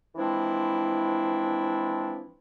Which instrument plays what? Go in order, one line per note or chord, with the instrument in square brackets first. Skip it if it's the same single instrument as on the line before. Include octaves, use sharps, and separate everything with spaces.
[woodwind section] E3 F3 G#3 C4 D4 E4